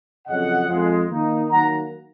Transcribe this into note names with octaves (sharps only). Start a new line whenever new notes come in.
F2 C#3 F#3 C#4 D#5 F#5
F2 F3 G#3
D#3 A#3 D#4
D#3 F#3 A#3 F#5 A#5